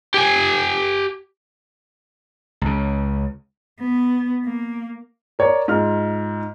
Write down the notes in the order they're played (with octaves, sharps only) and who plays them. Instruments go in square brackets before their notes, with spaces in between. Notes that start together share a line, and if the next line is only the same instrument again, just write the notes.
[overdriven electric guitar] G4 G#5
[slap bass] C#2 C#3
[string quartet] B3
A#3
[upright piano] A#4 C#5 D5
G#2 F4 F6